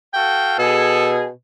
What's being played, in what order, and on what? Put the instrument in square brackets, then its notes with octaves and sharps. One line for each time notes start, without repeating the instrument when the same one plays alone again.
[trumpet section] F#4 A4 F5 [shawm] G5
[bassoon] B2 [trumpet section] G#4 [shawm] A4